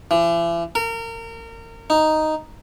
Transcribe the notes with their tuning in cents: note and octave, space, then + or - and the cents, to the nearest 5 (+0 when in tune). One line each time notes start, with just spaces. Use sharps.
E3 +40
A#4 -30
D#4 +0